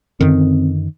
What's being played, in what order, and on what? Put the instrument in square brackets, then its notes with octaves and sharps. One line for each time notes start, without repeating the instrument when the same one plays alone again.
[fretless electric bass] F#2 D3 D#3 [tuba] C4